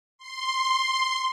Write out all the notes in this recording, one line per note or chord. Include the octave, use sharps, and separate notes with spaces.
C6